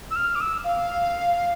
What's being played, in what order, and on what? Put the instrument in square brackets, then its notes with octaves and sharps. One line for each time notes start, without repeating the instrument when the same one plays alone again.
[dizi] E6
F6
D6
E6
F5